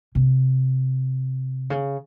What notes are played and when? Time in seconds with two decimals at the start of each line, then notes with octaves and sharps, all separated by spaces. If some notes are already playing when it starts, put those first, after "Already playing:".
0.15 C3
1.70 C#3